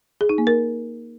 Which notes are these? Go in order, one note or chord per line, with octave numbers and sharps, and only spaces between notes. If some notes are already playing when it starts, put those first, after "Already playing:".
G#4
D#4
A#3
A#4